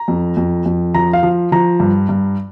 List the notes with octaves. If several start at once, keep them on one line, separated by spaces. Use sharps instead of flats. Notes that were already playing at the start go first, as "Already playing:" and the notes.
Already playing: A#5
F2
F2
F2
F3 A#5
F5
F3
F3 A#5
G2
G2